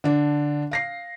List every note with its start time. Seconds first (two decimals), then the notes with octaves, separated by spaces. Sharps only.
0.04 D3 D4
0.71 F5 A#6 C7